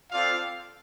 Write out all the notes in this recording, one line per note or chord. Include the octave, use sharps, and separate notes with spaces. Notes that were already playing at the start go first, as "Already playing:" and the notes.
C4 F4 A4 D5 F5